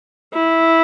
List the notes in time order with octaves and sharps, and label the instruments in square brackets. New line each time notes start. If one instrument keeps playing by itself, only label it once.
[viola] E4